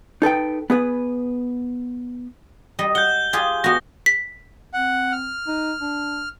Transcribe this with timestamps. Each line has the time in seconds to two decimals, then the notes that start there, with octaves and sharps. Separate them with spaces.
0.22 D#4 A4 B4 G5
0.70 B3 G#4 B4
2.79 G3 D#5
2.95 F#5 G6 G7
3.33 F4 G4 G#4
3.64 B3 F#4 A#6
4.06 B6
4.74 C4 F#5
5.12 F6
5.47 D#4
5.81 D4